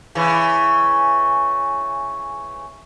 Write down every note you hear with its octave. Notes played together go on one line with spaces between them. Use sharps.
C#3 E3